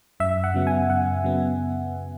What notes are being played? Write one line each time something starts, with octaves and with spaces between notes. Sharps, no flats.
F#2 E5
F#5
C#3 F#3 B3
G#5
F#2 F#5
C#3 F#3 B3